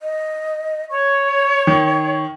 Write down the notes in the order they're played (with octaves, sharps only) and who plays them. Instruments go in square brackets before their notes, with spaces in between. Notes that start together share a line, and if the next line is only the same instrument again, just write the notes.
[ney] D#5
[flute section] C#5 [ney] C#6
[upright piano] D#3